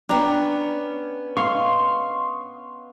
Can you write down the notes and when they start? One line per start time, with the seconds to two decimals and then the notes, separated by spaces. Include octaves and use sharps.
0.09 B3 C#4 D4 G5 A#5
1.37 D#5 F5 C6 C#6